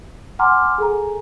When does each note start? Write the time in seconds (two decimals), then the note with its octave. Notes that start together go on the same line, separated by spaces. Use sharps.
0.39 F#5 G#5 A#5 C6 D6 F6
0.78 G#4 A4 G#5 A#5